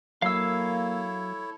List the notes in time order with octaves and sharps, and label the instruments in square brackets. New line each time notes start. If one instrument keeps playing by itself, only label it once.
[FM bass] F#3 [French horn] A#3 [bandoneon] E4 A4 C#5 [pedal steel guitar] F5 E6